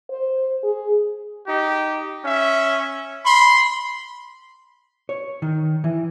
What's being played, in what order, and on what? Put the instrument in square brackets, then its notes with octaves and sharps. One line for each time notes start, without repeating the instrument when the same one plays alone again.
[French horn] C5
G#4
[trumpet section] D#4 G4
C#4 E5
B5 C6
[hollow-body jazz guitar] C#5
D#3
E3